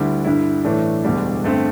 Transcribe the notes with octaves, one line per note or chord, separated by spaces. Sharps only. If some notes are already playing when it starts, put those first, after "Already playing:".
Already playing: D2 D3 G3 E4
G2 D3 G3 E4
A2 E3 A3 D4
E1 D2 D3 G3 D4
G2 D3 A3 C4